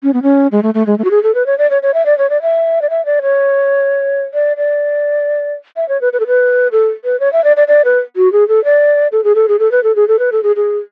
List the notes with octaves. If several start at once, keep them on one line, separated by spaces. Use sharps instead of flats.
C#4
B3
C#4
G#3
A3
A3
G#3
A3
F#4
G#4
A4
B4
C#5
D5
C#5
C#5
E5
D5
C#5
D5
E5
D5
E5
D5
C#5
D5
D5
E5
C#5
B4
B4
A4
B4
A4
B4
C#5
E5
D5
D5
D5
B4
F#4
G#4
A4
D5
A4
G#4
A4
G#4
A4
B4
A4
G#4
A4
B4
A4
G#4
G#4